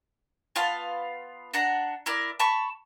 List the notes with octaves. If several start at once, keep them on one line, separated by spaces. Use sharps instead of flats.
B3 F4 F5 A5
D4 F#5 A#5
E4 A#4 D5
A5 B5 C#6